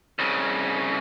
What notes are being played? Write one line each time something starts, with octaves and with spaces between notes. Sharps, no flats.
C2 C#3